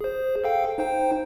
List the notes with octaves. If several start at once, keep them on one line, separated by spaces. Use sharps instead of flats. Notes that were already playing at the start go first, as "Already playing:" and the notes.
G#4 C5
A4 F5 G5
D#4 C5 G5